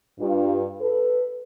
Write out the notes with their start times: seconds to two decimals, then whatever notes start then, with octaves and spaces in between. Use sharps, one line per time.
0.20 G2 F4
0.79 A4 B4